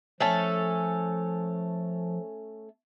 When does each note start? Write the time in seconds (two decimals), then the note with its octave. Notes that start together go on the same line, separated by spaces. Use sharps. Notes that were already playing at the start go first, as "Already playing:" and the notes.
0.20 F3 A3 C#4 A4